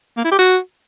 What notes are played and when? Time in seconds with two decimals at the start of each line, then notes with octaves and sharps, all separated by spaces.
0.17 A#3
0.24 E4
0.32 G4
0.39 F#4